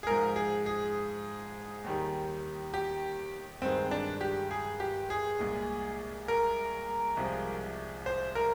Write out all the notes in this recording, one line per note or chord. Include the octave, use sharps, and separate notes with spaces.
G#4
G#2 F3 G#3 A#4
G#4
G#4
D#2 D#3 G3
G4
G2 D#3 G#3 C4
D4
G4
G#4
G4
G#4
C2 A#2 G#3
A#4
C2 C3 F3 G#3
C5
A#4